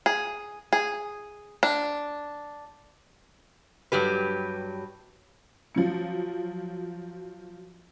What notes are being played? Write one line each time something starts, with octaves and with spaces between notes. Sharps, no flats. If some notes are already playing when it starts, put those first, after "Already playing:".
G#4
G#4
D4
G2 F#3 G4 B4
F3 F#3 C#7